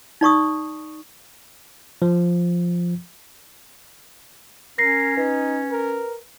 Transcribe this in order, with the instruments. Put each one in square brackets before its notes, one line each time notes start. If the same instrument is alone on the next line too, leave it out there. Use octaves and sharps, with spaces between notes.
[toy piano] D#4 D5 C#6 D#6
[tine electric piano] F3
[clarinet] C#4 [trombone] A#4 [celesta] A#6 C7
[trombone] D#4 [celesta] B4
[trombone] A#4